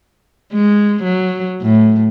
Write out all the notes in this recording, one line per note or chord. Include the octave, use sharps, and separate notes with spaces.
G#3
F#3
A2